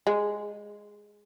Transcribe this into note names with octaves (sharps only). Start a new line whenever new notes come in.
G#3